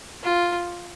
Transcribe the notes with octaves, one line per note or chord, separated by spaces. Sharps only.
F4